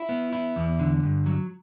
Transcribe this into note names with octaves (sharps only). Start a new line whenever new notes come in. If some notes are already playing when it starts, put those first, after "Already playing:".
Already playing: E4
B3
E4
E2
D3
G2
F#3